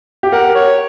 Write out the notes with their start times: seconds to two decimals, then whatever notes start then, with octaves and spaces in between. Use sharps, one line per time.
0.23 G4
0.32 A#4 F#5
0.55 C#5